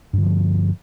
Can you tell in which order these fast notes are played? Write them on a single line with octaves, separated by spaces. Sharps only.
G2 D3 F3